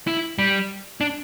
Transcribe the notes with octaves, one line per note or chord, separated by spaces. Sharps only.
E4
G3
D4